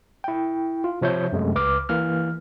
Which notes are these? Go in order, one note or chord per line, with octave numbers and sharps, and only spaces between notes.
E4 G5
F4
C3 F3 C#5 E5 G6
F#2 C3 G#3 A3
C#2 B4 D6 F6
E3 A#3 F6